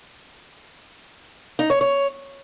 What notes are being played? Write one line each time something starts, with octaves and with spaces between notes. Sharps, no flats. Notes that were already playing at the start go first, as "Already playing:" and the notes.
D#4
C#5
C#5